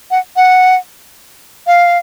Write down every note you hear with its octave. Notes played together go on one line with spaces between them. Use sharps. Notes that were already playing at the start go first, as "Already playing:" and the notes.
F#5
F#5
F5